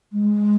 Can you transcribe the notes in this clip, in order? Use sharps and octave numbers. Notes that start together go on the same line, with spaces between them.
G#3